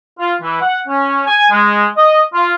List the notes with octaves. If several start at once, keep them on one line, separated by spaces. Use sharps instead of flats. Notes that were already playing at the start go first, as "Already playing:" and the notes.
F4
E3
F#5
C#4
G#5
G#3
D#5
F4